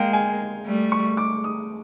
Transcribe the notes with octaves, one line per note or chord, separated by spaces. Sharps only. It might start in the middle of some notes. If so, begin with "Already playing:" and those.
Already playing: G#3 A#3 F5 G5
G#5
G3 A3
C#6
D6
D#6